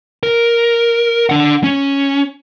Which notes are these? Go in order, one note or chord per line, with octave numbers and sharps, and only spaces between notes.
A#4
D4 F#5
C#4